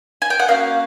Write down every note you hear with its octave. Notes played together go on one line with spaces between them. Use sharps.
G#5
G5
F#5
A#3 C#4 F#4 F5